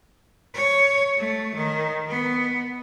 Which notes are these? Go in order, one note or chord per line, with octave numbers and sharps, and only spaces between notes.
C#5
A3
D#3
B3